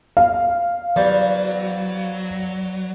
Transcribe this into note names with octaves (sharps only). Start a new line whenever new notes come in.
F5
E2 F#3 G3 C5